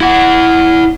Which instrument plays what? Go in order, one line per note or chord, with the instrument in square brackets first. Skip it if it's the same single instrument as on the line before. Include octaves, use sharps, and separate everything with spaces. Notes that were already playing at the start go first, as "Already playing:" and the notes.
[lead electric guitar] E4 F#5